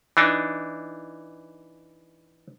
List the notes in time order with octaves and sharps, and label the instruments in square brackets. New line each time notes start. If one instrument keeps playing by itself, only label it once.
[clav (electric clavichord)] E3 D4 D#4